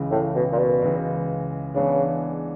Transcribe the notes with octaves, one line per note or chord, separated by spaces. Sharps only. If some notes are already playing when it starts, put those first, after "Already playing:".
Already playing: C#2 C#3 E3 G#3
A2
B2
A#2
B2
C#2 C#3 E3 G#3
C#3 E3 G#3 B3 D4